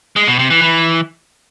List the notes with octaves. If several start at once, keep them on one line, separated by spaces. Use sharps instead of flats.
G#3
B2
C3
E3
E3